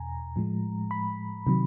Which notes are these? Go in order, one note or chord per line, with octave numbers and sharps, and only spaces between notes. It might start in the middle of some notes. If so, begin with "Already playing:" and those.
Already playing: E2 B2 G#5 A#5
A2 F3 G#3
B5
C3 D#3 F#3